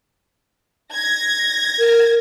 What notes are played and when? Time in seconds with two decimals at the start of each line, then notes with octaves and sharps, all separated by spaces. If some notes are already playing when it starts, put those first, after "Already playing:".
0.93 G#6 A#6
1.79 A#4